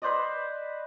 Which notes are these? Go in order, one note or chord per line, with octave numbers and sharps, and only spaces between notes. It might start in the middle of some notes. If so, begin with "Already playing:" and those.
B4 C5 D5 D#5